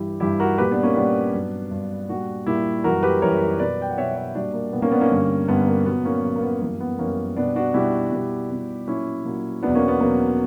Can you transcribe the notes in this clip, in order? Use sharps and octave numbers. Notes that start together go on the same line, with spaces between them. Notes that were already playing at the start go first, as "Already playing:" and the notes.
Already playing: G2 E3 G3 E4 G4
G2 E3 G3 E4 G4
F#4 A#4
A#2 G3 G4 B4
B3 D4
A#3 C#4
A#2 G3 B3 D4
G2 F#3
G2 F#3
A#2 G3 D4 F#4
A#2 G3 E4 G4
F#2 E3 G3 F#4 A#4
G4 B4
F#2 E3 G3 A#4 C#5
B2 F#3 B4 D5
G5
F#5
B2 F#3 C#5 E5
C#5 E5
A#2 G3 D4 F#4
A#3
A#2 G3 B3
A#3 C#4
B3 D4
A#3 C#4
G2 D3 G3
G2 D3 G3 B3
A#3
A#2 F#3 B3
A#3 C#4
A#2 F#3
A#3
B3
F#2 E3 G3 A#3
B3
F#2 E3 G3 A#3 C#4
B2 G3 B3 D4
D4 F#4
B2 G3 E4 G4
B2 G3
B2 G3
A#2 F#3 C#4 E4
A#2 F#3
E2 B2 F#3 B3 D4
A#3 C#4
B3
E2 B2 F#3 A#3